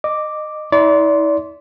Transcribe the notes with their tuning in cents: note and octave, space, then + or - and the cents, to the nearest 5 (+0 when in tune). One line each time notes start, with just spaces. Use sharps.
D#5 -20 D6 +0
E4 -45 D5 -30 C6 +0